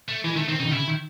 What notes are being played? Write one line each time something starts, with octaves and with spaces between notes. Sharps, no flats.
A3
E3 G#3
D#3 A3
D#3 C4
C#3 D#4
D#3
C#3 E4
D#3